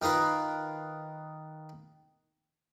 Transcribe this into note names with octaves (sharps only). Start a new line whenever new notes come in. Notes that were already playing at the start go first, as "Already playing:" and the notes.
D#3 D#4 F4 B4